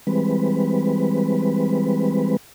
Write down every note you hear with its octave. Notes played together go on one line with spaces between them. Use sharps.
E3 G3 G#3 C4 B4